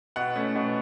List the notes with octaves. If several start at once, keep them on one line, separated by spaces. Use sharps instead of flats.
B2 F#5
A3 C#4
B2